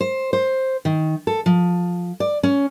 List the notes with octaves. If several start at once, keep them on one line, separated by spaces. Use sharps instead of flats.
C5
C5
D#3
A4
F3
D5
C#4